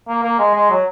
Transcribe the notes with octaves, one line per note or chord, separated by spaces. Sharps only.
A#3
A#3
G#3
G#3
F#3